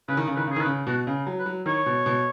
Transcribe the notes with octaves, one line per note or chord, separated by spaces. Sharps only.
C#3 B4
D#3
C#3
D#3 B4
C#3 G#4
D#3 B4
C#3
B2 F#4
C#3
F#3
B4
F#3
D#3 C#5
B2
B2